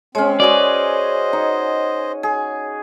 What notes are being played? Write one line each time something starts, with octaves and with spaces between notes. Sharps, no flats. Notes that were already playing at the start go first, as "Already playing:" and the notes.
G#3 C4 C#4 C#5 G#5
F#4 G#4 B4 C5 D5 D#5
D#4
G#4